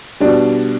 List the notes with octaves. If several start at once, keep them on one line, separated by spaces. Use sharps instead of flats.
B2 G3 D4